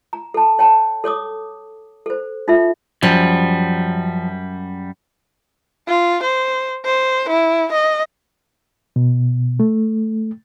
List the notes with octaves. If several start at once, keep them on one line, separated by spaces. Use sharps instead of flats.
A#5
A4 A5
C#5 G5 A5
A4 C#5 D6 D#6
A4 C5
D#4 F4 A4 E5
F#2 F3 G3
F4
C5
C5
E4
D#5
B2
A3